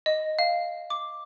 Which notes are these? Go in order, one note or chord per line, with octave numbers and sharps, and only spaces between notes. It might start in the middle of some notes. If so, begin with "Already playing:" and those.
D#5
F5
D6